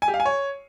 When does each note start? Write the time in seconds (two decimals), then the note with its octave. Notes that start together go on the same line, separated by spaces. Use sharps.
0.02 G#5
0.08 G4
0.14 F5
0.20 G#5
0.26 C#5